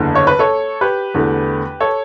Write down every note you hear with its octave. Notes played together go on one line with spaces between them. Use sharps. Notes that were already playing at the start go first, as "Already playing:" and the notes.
Already playing: F#1 E2 D3
C#5
B4
A4 C#5
G4 B4
E2 D3 A3
A4 C#5